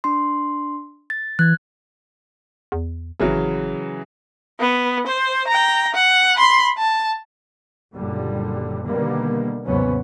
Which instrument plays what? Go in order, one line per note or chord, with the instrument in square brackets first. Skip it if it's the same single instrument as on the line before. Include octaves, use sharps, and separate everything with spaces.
[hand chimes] D4 C6
A6
[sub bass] E3 [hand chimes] F#6 G#6
[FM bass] E2
[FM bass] G#1 [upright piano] C#3 E3 F#3
[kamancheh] B3
C5
G5 A#5
F#5
B5 C6
A5
[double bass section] F#1 A#2 D3 G3
B2 D3 D#3 G3 A#3 B3
D#2 G#2 C3 F#3 B3 C#4